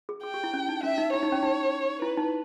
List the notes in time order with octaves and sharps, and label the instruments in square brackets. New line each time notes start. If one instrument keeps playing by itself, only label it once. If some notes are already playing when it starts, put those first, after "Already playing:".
[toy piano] G#4
[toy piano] G#4 [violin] G5
[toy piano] G4
E4
C#4
D#4
[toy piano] C#4 [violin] E5
[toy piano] D#4
[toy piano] E4 [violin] C#5
[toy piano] D#4
C#4
D#4
[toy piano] E4 [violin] B4
[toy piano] D#4